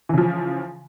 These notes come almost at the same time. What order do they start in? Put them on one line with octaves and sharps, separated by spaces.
E3 C#3 F3